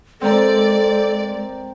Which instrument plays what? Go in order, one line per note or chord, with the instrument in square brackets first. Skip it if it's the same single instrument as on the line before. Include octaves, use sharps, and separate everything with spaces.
[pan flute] G#3 [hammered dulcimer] C4 A#4 [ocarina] A4 [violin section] D5